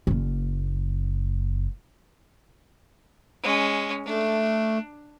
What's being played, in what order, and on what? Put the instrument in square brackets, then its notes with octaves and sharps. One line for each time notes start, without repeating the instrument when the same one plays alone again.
[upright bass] F#1 A#3
[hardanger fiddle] G#3 C#4
[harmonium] A3 [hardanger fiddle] D4